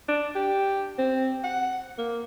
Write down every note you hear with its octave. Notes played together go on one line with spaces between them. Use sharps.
D4
G4
C4
F#5
A#3